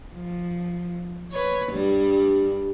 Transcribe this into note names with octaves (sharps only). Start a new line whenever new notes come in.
F3
B4 C#5
G2 G3